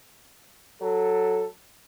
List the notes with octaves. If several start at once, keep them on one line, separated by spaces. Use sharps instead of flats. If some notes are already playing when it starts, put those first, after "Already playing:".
F#3 A4